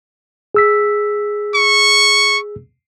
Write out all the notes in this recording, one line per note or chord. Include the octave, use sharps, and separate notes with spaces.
G#4 E6 B6
C#6